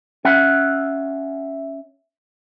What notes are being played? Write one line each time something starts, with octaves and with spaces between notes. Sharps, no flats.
C#4 E5 F#5